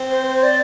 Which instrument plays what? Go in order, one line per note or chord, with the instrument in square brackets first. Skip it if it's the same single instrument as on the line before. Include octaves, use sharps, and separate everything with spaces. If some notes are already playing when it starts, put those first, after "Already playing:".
Already playing: [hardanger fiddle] C4
[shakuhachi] C5
C5
D5